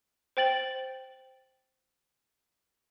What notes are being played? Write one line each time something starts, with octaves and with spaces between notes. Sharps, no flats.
C5 G5 A6 F#7